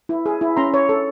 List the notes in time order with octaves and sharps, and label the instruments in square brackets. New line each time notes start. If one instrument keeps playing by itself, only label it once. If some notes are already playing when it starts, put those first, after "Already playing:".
[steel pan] E4
G#4
E4
C#4 A#5 C6
C#5
A4